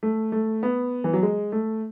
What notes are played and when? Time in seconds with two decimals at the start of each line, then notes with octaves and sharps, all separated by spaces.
0.03 A3
0.32 A3
0.63 B3
1.04 E3
1.13 F#3
1.23 G#3
1.52 A3